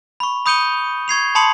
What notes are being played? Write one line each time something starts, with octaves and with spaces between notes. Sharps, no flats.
B5 C#6
B5 D#6 G6 C#7 D#7 G7
C#6 G#6 C7 F7
A5 B5 C6 D#6 C#7 F#7